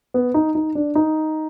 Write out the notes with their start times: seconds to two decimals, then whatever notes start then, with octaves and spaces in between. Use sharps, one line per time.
0.14 B3
0.34 D#4
0.55 D#4
0.75 D4
0.95 D#4